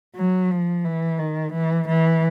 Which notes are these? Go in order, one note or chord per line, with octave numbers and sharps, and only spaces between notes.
F#3
F3
E3
D#3
E3
E3